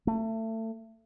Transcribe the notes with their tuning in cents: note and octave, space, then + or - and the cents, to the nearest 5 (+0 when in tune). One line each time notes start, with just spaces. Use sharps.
A3 +25